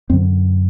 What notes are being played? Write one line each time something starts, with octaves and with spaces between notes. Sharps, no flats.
F#2 D3 C4